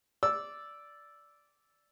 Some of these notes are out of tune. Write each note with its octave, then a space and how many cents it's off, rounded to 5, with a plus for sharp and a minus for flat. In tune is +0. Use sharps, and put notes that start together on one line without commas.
D5 -5 E6 +0